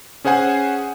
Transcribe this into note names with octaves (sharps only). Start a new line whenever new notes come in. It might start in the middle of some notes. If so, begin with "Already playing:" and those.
C#4 G#4 C5 F#5 G#5